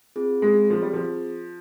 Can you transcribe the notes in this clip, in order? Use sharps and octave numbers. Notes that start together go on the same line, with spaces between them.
C4 F4 G#4
G#3
F3
G3
F3